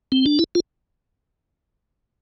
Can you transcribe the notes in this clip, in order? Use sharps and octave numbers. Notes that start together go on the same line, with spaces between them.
C4
D4
E4
F4